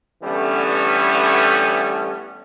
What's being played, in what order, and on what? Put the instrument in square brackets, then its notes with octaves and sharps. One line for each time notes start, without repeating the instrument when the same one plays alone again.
[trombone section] D3 E3 G3 A3 B3 C#4